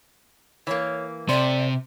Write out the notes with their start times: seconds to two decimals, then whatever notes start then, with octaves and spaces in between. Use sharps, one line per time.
0.67 E3 A#3 C#5
1.29 C3 A3 C5 D5